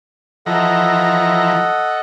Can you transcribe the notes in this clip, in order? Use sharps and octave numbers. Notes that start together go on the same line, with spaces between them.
E3 F3 A4 D#5 F#5 A#5